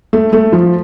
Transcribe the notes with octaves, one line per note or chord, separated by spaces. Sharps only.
A3
A3
F3